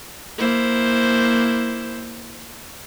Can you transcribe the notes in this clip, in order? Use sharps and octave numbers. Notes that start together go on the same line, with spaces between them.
A#3 E4 C5